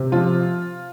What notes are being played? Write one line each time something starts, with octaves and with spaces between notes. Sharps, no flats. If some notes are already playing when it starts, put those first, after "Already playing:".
Already playing: C3
F3 F4